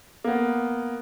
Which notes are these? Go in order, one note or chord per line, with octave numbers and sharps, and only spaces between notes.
A#3 B3